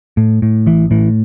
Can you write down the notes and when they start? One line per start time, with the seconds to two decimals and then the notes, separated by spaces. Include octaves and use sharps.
0.17 A2
0.42 A2
0.66 A1 E3
0.91 A2 E3